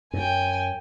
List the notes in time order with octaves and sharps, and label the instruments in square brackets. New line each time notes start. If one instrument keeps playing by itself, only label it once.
[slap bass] F#2 [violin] G5 G#5